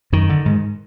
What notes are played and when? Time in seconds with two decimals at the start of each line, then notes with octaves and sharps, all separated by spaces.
0.12 F#2 D#3
0.29 D3
0.46 G#2